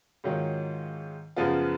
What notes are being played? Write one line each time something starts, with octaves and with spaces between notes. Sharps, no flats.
G#2 D#3 F#3 C#4 F4
F#2 C#3 F3 B3 F4